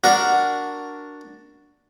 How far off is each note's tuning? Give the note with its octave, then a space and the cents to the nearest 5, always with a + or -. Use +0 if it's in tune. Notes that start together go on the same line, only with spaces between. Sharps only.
D4 +0 F#4 +0 A#4 +0